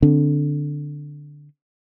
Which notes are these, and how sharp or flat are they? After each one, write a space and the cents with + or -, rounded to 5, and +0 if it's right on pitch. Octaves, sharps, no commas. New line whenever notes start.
D3 +0 C4 +0